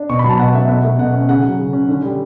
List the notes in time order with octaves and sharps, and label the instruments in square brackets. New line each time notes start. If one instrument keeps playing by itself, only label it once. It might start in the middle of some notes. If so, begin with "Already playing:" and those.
Already playing: [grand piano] D4
B2 C#6
F#3 B5
A5
B2 F#5
A3 E5
B2 F#5
A3
B2 F#5
C#4
C#3 F#5
F#3
C#3
C#4
D3
G3